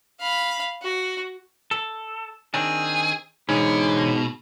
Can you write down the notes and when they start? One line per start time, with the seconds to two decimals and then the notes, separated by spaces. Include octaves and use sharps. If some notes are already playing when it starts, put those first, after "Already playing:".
0.20 F5 B5
0.83 F#4
1.71 A4
2.54 D#3 C4 D4 G#4
3.49 G#2 B2 D3 E3 C#4